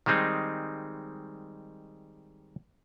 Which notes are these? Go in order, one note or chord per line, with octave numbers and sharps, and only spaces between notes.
D#3 G3 G#3 C4 D#4